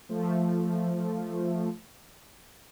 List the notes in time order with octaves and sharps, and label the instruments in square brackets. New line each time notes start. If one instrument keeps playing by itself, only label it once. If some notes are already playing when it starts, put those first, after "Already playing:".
[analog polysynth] F3 A3